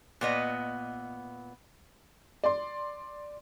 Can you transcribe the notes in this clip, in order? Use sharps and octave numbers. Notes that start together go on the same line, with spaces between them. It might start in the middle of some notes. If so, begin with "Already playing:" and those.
A#2 B3 D#5
D5 C6